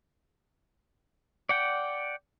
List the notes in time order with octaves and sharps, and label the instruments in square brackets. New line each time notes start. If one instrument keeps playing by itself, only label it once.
[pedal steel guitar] D5 F#5 G5